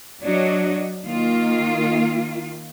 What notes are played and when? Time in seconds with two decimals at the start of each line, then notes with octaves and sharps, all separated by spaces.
0.22 F#3 D4 F#4 C#5 D#5
1.06 D#3 A#3 F4